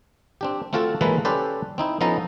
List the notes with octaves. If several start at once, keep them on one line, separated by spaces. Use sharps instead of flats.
C4 D4 G4
A3 C4 F4 F#4 A4
E3 F#3 G#3 A#3 A4 B4
C#4 G4 A4 B4 C5 D5
C4 D#4 E4
F3 B3 C#4 D#4 A4 A#5